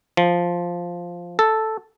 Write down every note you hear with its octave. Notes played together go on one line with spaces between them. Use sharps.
F3
A4